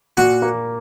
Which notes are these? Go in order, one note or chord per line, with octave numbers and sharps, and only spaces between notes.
A#2 F#4
A#3